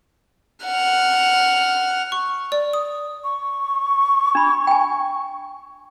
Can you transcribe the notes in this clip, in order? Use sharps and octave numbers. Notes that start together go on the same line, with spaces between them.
F#5 F6
C#6
D5
D#6
C#6
D4 B5
G5 G#5